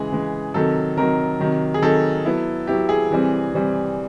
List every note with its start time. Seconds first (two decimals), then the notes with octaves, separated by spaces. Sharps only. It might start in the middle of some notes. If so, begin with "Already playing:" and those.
Already playing: C#3 E3 G#3 G#4
0.11 C#3 E3 G#3
0.54 C3 D#3 F#3 A4
0.97 C3 D#3 F#3 A#4
1.40 C3 D#3 F#3
1.74 G#4
1.82 C3 D#3 F#3 A4
2.25 F#3 B3 E4
2.67 F#3 B3 E4 G4
2.89 G#4
3.10 C3 E3 G3 C4
3.54 C3 E3 G3 C4